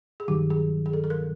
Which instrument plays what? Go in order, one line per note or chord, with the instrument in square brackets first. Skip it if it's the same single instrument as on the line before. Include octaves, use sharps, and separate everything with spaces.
[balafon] G#4
[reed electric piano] G2 D#3 F#3 [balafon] G4
[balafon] G#4
G#4
A4
A4
A#4